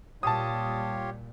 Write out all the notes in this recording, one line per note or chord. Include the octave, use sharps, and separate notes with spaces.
A#2 G3 F4 G4 C#5 A5 D#6